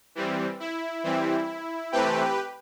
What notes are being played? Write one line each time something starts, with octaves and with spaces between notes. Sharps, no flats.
E3 G3 C4
E4
E3 G3 C4
C3 E3 A3 C4 G4 B4